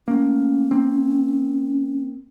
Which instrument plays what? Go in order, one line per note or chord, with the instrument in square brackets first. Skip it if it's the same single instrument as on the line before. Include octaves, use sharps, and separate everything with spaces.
[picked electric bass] A3 A#3 [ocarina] C#4
[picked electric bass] A#3 C4